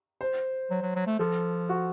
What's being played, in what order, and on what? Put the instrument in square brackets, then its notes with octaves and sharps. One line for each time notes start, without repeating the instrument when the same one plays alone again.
[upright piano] C5
[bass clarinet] F#3
F#3
F#3
A3
[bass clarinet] F3 [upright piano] A4
[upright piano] F#4